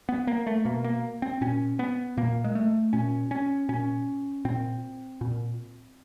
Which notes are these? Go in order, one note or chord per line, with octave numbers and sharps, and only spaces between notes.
B3
A#3
A3
B2 A#3
A#3
C4
A#2 C#4
B3
A#2 A#3
G#3
A3
A#2 C#4
C#4
A#2 C#4
A#2 C4
A#2